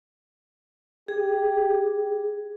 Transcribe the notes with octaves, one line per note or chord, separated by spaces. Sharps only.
G4 G#4